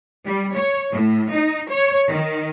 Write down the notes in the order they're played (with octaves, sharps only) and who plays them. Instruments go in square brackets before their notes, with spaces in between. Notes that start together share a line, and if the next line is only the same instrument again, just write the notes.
[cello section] G3
C#5
A2
D#4
C#5
D#3